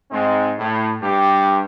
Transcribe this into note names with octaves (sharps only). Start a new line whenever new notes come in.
G#2 G#3 C4 D#4
A2
G2 G4